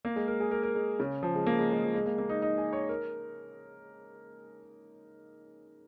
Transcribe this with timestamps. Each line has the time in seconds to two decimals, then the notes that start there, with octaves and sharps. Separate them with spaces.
0.05 A#3
0.16 G#3
0.28 A#4
0.40 G#4
0.51 A#4
0.63 A#4
0.75 G#3
1.00 C#3
1.23 F3
1.35 G#3
1.46 A#3
1.59 G#3
1.71 G#3
1.83 F3
1.94 G#3
2.06 A#3
2.18 A#3
2.29 D#4
2.42 D#4
2.58 G#4
2.73 C#5
2.89 A#4